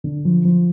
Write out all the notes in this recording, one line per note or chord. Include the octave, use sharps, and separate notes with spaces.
D3
F3
F3